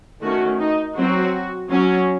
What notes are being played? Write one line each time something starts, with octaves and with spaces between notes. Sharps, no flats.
D#3 A3 C#4 F#4
D#4
F#3 C4 F#4
F#3 C#4